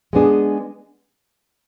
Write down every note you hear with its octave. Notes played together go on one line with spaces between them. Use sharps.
G#3 B3 D4 G#4